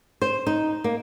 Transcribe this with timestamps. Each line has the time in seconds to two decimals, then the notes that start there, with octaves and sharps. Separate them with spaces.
0.22 C5
0.47 D#4
0.84 A#3